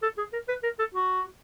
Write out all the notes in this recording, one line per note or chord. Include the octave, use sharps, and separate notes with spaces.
A4
G#4
A#4
B4
A#4
A4
F#4